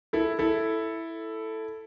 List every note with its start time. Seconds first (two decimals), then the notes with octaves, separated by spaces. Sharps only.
0.13 E4 A4
0.39 E4 A4